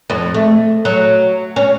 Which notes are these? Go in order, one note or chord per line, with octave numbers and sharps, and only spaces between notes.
F2
A3
F#3
C#4